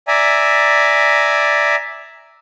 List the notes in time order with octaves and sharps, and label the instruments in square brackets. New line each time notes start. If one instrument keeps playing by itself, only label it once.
[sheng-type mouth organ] D5 E5 G#5 A#5